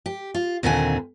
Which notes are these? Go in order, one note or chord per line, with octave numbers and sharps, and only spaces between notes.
G4
F4
D#2 A#2 D3 C4 G#5